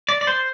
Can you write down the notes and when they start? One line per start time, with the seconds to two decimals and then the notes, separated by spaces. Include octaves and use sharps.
0.09 D5
0.21 D5
0.27 C5